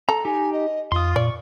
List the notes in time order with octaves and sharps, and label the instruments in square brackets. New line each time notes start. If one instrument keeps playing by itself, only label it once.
[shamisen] A4 [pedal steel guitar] A#5
[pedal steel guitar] D#4 G4 [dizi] G#5
[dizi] D#5
[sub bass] F2 [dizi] F4 [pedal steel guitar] C6 D#6
[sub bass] A#2 [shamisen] D5 [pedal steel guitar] C#6